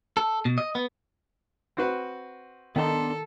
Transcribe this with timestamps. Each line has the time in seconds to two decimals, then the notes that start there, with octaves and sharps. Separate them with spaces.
0.17 A4
0.45 B2
0.58 D#5
0.75 B3
1.77 C4 F#4 B4
2.76 D#3 B3 D4 D#4 A4 C6